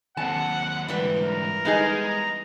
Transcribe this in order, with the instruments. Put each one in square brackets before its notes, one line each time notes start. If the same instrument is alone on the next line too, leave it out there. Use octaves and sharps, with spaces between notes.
[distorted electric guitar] D#2 C4 [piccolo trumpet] F#5 [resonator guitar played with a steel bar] A5
[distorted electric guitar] G#2 D3 [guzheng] E3 G3 B4
[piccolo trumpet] A#4
[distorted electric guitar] G#3 [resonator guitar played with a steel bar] B3 D#4 G#4
[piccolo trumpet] A#5